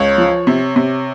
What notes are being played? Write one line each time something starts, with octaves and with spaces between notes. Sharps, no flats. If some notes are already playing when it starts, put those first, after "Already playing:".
Already playing: C#2 C#5
F3
C3
C3